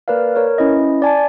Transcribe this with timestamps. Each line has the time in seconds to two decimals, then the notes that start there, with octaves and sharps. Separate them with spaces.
0.08 A#3 A#4 B4 D5 F5
0.36 A#4 C#5
0.58 C#4 E4 B4 D#5
1.02 D5 G#5 A5